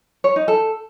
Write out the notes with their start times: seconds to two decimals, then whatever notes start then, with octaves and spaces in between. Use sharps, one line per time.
0.24 C#5
0.36 D#4
0.48 A4